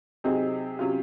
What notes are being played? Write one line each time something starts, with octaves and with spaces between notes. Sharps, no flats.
C3 F#3 C4 D#4 G#4
C3 F#3 C#4 F4